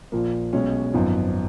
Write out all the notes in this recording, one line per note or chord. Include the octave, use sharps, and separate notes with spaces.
A#1 A#2 F3 A#3
B1 B2 G#3 C#4
G#1 F#2 F3 B3 D#4